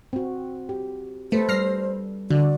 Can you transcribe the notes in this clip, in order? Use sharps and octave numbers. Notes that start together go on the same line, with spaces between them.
C4 F#4
G4
A3 A4 B4 C5
G3 F6 A#6 C7
D3 F#4 D5